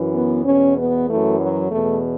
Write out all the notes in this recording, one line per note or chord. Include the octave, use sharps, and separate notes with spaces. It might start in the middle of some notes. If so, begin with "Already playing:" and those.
Already playing: F#2 E3
B3
E2 B2 C#4
B3
F#2 E3 A3
F#3
E2 B2 A3